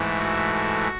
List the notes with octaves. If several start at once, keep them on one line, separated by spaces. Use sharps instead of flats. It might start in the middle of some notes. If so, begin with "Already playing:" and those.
Already playing: G#2 E3 A3
F#4